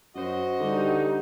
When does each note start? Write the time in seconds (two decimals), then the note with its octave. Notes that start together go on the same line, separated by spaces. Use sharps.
0.15 F#2 F#4 C5 D#5
0.60 D3 G3 D#4